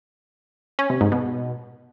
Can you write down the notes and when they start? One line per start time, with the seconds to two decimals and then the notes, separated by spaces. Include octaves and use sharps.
0.79 C#4
0.90 C3
1.01 G#2
1.12 B2